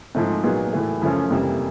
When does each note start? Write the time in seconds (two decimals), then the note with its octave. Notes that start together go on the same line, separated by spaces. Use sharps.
0.15 G#2 F3 A3 C4 D#4
0.43 A#2 F#3 B3 D#4 G#4
0.73 A2 E3 A3
1.02 F#2 C#3 F3 A3 C#4
1.31 F2 C3 E3 G3 A#3